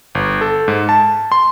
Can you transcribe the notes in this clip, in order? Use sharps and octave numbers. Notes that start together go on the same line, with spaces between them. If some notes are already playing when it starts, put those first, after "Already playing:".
G1
A4
G#2
A5
C6